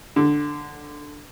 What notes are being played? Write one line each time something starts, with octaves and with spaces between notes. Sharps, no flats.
D3